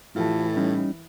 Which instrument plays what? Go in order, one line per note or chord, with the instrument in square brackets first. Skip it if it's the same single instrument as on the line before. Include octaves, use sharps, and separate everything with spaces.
[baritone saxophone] A2 [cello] E3 [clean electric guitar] F4 G4 A4
[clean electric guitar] G3 C#4 D#4